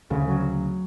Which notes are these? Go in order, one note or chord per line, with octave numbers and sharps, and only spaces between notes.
D2 C#3
F#3